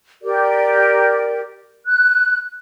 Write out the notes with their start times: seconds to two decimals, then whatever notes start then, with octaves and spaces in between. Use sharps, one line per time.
0.23 G4 A#4 D5
1.85 F#6